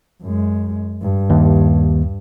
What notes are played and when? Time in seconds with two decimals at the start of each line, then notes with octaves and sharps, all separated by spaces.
0.22 F#2 G#3
1.01 G2
1.30 D#2